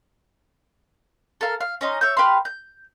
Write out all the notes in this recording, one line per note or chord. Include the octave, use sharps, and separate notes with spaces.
A4 A#4 F5
F5
C#4 D#4 D#5 C6
C#5 E5 G6
G4 B4 F5 C6
G6